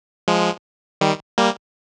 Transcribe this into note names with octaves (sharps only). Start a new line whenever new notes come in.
F3 G#3
D#3 G3
G3 A#3